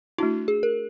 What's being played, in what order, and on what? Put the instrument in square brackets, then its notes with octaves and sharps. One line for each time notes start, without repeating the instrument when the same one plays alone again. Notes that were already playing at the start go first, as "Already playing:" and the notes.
[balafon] A3 D4 F#4 [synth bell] E4
[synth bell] G#4
A#4